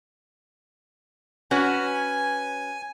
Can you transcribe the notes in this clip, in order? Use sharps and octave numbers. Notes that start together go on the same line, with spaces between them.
C#4 F#4 B4 G#5